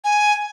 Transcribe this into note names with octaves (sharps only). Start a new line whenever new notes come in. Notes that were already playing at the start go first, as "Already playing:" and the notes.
G#5